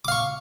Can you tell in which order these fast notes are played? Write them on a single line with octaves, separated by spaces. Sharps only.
D6 F5 C#6